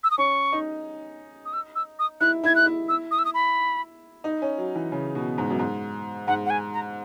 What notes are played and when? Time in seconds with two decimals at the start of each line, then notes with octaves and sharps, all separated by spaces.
0.04 E6
0.11 D#6
0.18 C#4 C#6
0.52 D#4
1.45 D#6
1.53 E6
1.75 E6
1.99 D#6
2.21 E4 F#6
2.44 E4 G#6
2.56 F#6
2.66 E4
2.89 E6
3.11 D#6
3.19 E6
3.25 D#6
3.34 B5
4.24 D#4
4.42 C#4
4.58 F#3
4.75 E3
4.92 C#3
5.15 B2
5.38 G#2
5.50 F#2
5.59 G#2
6.27 G#2 F#5
6.46 F#5
6.50 G#5
6.73 A#5